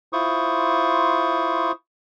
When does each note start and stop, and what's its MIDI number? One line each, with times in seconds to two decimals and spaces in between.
0.13 1.72 64
0.13 1.72 65
0.13 1.72 72
0.13 1.72 85
0.13 1.72 87